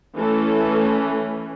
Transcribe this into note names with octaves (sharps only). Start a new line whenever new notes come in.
E3 A3 C#4 A4